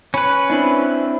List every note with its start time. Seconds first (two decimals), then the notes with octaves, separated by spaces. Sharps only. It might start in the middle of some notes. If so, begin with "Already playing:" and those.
0.14 C#4 B4 B5
0.50 C4 D4 E4